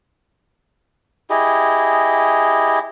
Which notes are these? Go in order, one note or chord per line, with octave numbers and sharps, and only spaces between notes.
E4 G4 G#4 D#5